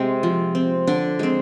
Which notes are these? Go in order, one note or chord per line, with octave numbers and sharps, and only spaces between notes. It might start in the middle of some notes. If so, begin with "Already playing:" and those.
Already playing: C3 G#3 C4
F3
C4
D3 D4
G#3 C4